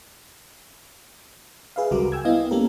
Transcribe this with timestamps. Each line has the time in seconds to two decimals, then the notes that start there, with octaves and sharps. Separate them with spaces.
1.76 G#4 B4 E5 F5
1.91 C#2 G3 F#4 A#4 D6
2.12 G5 G#5 E6 G#6
2.25 B3 E4 D#5 F5
2.51 A#3 C#4 G4 A4 A#4